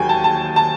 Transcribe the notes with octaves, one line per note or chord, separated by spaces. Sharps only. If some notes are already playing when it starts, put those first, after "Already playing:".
Already playing: E1 D#2 D#3 F#3 G5 G#5
A5
A5
A5